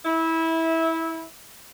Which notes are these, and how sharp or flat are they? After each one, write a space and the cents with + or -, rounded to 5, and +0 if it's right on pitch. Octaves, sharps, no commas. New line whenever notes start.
E4 -20